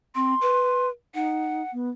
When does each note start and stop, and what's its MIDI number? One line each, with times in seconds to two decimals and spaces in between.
0.15 0.34 60
0.15 0.88 84
0.41 0.89 71
1.15 1.62 63
1.15 1.71 78
1.73 1.90 59